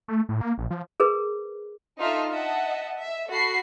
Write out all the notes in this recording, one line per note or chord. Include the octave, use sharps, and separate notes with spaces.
A3
A2
A#3
A#1
F3
G#4 A#4 B4
D4 D#4 F4 A4 E5 F6
D#5 E5 F#5 A5
E5
F#4 A4 B5 C7